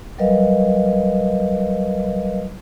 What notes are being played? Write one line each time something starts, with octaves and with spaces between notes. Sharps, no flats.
F#3 G3 A#4 B4 D#5 F5